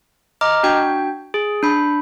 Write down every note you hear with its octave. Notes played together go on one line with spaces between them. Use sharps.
D#5 A#5 D6 F6
D4 F#4 G5
G#4
D4 B5